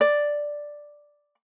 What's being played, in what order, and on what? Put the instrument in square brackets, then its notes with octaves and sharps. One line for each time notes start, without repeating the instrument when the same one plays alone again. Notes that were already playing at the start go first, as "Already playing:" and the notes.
[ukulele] D5